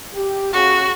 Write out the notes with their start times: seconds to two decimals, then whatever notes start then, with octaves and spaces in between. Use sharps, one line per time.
0.14 G4
0.53 C#3 F#4